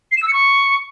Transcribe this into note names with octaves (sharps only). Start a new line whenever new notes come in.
C7
E7
E6
C#7
C#6